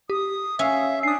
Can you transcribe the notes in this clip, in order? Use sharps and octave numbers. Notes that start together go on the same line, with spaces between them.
G4 D#6
C#4 E5 F5
D4 G#5 D#6 C7